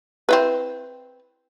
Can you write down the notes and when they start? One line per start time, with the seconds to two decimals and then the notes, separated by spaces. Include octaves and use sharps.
0.29 C4 E4 B4